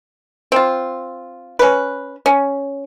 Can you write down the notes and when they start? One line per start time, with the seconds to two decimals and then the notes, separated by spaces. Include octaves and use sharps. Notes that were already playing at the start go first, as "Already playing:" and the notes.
0.52 C4 F4
1.59 C#4 B4
2.26 C#4